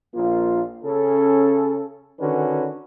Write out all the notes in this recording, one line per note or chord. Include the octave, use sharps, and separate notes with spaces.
A#1 A#3 F4
C#3 C#4 A4
D3 D#3 C#4 F#4 B4